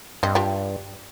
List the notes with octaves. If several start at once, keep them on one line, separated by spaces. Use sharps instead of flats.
G2 C4 D#5
F4 G4 G5